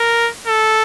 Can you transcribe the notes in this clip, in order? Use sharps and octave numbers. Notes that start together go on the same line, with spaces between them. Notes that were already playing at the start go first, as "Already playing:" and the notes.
Already playing: A#4
A4